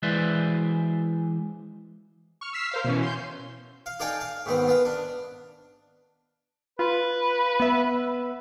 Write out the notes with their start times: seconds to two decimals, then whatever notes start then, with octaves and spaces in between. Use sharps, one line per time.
0.03 E3 G#3 B4 C5 D5 E5
2.41 C#6 F6
2.53 E6 F6 B6 C7 E7
2.71 A#4 C5 F5
2.84 B2 E3 C#4
3.03 C6 G6
3.86 F5
4.00 D#4 A4 D5 F5 G5 G#5
4.21 F5
4.46 G#2 D#3 B3 C4
4.68 B3 F5
4.86 D4
6.79 F4 B4
7.60 B3 E5